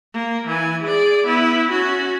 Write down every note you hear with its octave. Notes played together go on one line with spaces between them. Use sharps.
A#3
E3 G#5
G#4 D5
B3 E4
C#4 F#4